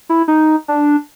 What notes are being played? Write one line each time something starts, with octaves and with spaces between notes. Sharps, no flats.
E4
D#4
D4